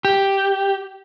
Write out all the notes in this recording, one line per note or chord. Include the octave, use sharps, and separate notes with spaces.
G4